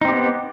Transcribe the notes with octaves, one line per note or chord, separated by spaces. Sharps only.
B3 C4 D#4 G4